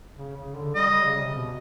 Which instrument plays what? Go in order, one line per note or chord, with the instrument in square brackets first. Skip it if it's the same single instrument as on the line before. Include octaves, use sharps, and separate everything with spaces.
[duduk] C#3
C#3
D3
[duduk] G3 [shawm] D#5
[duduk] G3
C#3
C3
B2